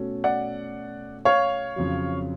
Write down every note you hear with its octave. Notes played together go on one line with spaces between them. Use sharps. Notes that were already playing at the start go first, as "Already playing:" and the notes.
Already playing: B2 A3 C#4 F#4 A4
D5 F#5
C#5 F5
F2 C#3 F#3